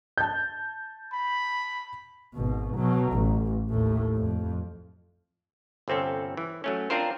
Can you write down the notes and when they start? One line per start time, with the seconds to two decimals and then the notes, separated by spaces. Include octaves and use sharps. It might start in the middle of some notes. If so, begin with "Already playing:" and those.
0.18 A5 G6
1.13 B5
2.34 G#1 B2
2.76 B2 F#3
3.13 A1
3.70 D#2 A2
4.16 F2
5.88 G1 C3 C4 C#4 A4
6.37 E3
6.64 F#3 A3 C#4
6.90 C4 D4 F4 A#4 C5